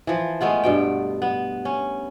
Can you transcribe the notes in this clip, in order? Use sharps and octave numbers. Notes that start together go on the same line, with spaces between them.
E3 F3
G#3 A3 B3 F4
G2 B2 G5
B3
C#4